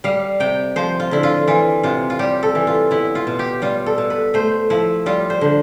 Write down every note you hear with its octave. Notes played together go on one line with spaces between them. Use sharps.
G3 F5
C3 G5
F3 C5
F4
D3 E4
F4
E3 F4
C3 F4
F4
G3 G4
A4
E3
F4
B3 E4
F4
B2
G4
G3 F4
A4
B2
B4
A3 C5
F3 E4
G3 F4
C5
D3